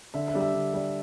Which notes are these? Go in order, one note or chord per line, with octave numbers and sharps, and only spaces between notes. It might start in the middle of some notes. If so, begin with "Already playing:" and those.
D3 E5
E5
G3 D4 D5
E5
D3
G3 D4